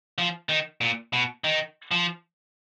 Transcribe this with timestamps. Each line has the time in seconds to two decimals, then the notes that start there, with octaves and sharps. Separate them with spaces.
0.18 F3
0.49 D#3
0.81 A#2
1.13 B2
1.44 D#3
1.91 F3